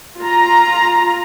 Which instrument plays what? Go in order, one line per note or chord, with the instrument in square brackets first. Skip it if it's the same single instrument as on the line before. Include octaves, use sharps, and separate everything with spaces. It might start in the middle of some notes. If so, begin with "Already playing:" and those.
[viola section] F4 A#5